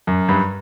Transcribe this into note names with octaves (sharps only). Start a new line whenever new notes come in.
F#2
G2